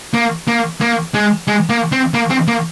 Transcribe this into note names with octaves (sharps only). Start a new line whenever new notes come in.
A#3
A#3
A#3
G#3
G#3
A#3
C4
A#3
C4
A#3